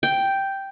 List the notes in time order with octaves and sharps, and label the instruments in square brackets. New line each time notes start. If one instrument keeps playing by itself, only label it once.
[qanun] G5